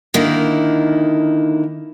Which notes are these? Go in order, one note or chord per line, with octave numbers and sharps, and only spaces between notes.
D3 D#3 A#3 D#4 E4